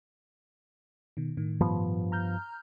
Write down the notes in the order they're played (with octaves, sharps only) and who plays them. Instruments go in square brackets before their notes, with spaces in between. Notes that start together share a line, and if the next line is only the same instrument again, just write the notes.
[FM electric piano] B2 D#3
A2 D#3
[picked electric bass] G2 F3 B3
[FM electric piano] A#5 F6 G6